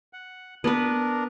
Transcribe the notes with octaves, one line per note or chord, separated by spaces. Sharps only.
F#5
B3 D4 A#4 B4